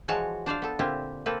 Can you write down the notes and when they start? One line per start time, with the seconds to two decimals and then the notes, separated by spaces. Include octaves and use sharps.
0.08 E3 F3 G#3 F#4 C#5 A5
0.46 D4 C5 D5 F5
0.62 B3 A4
0.79 A#2 D3 C4 E4 F4 G4
1.26 A#3 C4 A4 B4